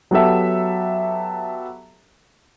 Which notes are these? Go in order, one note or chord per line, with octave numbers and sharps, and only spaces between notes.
F#3 B3 G4 A4 E5